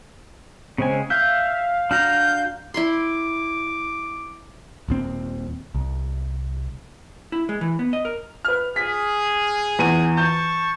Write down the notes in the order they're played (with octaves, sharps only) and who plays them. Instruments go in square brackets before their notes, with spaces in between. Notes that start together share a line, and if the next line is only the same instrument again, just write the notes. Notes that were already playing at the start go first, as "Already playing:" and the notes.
[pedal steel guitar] C#3 G#3 G#5 [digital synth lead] C4
[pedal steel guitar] E5 [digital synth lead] F5 [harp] G6
[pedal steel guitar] D4 F#4 A#5 [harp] F6 [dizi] G6
[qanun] E4 B5 C6 [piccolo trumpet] D6
[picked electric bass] D#1 D#2 C4
C2
[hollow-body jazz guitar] E4
G#3
E3
B3
D#5
A#4
[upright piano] B4 F6
[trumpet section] G#4 [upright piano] B6
[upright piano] E2 D#7
[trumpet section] A5 C#6 [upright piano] G6